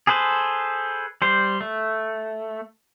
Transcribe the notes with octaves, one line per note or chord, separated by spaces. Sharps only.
G#4 A4 B4 C5
G3 C5
A3